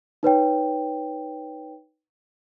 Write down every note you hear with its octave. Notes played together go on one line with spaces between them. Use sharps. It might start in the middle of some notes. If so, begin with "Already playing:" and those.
D#4 B4 C#5 G5